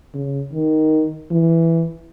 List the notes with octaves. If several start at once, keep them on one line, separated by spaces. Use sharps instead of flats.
C#3
D#3
E3